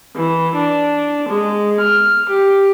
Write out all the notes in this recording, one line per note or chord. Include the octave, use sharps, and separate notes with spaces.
E3
D4
G#3
F6
G4